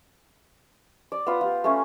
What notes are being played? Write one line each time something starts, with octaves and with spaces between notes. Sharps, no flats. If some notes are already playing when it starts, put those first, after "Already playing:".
D5
B3 F4 D#6
F4 G4
A3 C#4 G#5